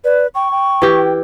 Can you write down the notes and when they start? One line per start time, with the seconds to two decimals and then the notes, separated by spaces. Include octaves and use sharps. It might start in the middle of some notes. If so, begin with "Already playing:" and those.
0.04 B4 D5
0.35 G5 C#6
0.51 G5
0.82 E3 G4